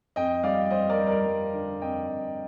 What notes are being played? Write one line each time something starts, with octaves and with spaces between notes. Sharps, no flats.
F2 D#5 G5
G3 D5 F5
G3 C5 D#5
A#4 D5
G3
A#4 D5
G3
D3
F2 D#5 G5
F2